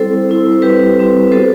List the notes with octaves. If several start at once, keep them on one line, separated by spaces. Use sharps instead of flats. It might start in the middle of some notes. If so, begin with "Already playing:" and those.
Already playing: G3 C4 E4 A4 C5
G3 C4 E4
C5
G3 C4 E4 G4 B4
G3 C4 E4
B3 F#4 A4 C5